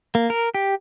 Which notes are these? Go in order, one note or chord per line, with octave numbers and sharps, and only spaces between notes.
A#3
A#4
G4